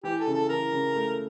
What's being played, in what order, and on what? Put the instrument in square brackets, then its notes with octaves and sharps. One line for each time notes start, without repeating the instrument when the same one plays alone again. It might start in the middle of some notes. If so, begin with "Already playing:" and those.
[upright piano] E3 [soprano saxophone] G4
[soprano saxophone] A4
[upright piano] C#3
[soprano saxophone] A4
[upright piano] E3 [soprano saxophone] A#4
[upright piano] C#3
A3